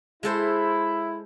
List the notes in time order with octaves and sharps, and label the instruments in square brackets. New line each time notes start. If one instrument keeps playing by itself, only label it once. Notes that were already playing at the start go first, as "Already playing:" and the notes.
[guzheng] G#3 A4 C5 [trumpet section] E4